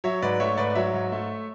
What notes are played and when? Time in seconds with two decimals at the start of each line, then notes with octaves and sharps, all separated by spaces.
0.04 F#3 C#5 E5
0.22 G#2 B4 D5
0.40 A3 C#5 E5
0.58 G#2 B4 D5
0.70 D5
0.75 F#3 C#5 E5
0.93 G#2
1.12 A3